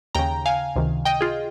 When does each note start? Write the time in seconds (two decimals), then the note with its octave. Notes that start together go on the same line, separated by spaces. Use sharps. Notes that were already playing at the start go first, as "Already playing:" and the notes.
0.15 D#2 C#3 G5 A#5
0.46 F5 G#5
0.76 C#2 C3 D#3
1.05 D#5 G5
1.21 F4 G#4